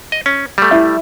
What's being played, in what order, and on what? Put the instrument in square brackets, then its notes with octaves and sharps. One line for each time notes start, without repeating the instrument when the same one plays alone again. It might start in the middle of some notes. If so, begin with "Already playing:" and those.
[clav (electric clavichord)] D#5
C#4
G3 A3
[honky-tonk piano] E4